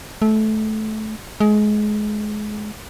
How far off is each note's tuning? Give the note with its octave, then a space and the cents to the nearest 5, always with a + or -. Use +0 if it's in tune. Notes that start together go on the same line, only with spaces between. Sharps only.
A3 -20
G#3 +25